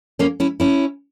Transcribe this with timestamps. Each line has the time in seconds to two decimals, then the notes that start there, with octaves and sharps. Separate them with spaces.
0.19 A#3 C#4
0.40 C#4 E4
0.60 C#4 E4